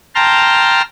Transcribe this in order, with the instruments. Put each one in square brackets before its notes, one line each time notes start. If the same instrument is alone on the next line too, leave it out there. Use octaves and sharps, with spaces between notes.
[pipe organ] G5 A5 A#5 C6 F6